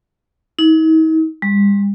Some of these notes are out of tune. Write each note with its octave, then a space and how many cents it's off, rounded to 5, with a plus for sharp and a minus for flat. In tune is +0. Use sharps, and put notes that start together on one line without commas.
D#4 +40
G3 +45